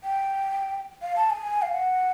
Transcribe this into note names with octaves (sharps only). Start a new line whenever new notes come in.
G5
F5
A5
G#5
F5
F#5